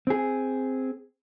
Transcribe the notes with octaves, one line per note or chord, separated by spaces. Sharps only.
C4 G#4